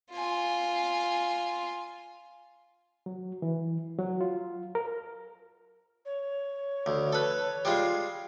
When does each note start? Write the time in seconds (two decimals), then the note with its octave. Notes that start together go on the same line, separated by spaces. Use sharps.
0.12 F4 G#5
3.06 F#3
3.42 E3
3.99 F#3
4.21 F4
4.75 A#4
6.05 C#5
6.86 D2
7.13 A4 B4
7.65 G3 G#3 F4